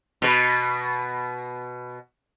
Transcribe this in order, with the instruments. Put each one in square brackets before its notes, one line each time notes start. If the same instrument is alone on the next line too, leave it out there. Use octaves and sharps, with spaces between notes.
[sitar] B2 B4